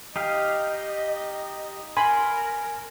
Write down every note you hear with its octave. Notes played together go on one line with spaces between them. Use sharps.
D#4 G4 D#5 F5
A#4 G#5 B5 C6